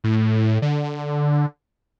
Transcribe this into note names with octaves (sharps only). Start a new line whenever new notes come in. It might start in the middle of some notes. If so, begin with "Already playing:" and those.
A2
D3